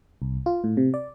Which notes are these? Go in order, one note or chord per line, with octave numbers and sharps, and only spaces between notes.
C2
F4
A2
C3
D5